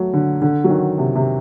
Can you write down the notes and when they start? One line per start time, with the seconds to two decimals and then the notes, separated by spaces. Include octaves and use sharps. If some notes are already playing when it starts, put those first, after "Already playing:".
Already playing: F#3 A3
0.13 D3
0.42 D3
0.64 F#3
0.70 D#3
0.98 C3
1.16 C3